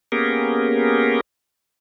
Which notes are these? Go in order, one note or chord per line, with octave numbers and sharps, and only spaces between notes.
A#3 B3 C#4 G4 G#4 A#4